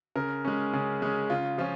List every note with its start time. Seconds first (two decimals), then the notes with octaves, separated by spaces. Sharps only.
0.16 C#3 A#4
0.45 G#3 C#4
0.73 C#3
1.02 G#3 C#4
1.30 C#3 F4
1.58 F3 C#4 F4